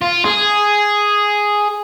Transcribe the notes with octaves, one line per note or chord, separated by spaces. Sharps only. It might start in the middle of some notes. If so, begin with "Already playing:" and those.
F4
G#4